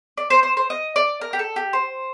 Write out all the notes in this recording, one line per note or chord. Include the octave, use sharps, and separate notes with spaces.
D5
C5
C5
C5
D#5
D5
A#4
G4
A4
G4
C5